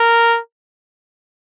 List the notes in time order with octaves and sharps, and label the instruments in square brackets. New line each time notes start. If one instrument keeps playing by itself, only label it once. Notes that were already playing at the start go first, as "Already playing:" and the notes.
Already playing: [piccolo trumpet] A#4